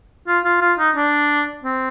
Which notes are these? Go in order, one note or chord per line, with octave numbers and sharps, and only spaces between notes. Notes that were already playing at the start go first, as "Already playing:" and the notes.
F4
F4
F4
D#4
D4
C4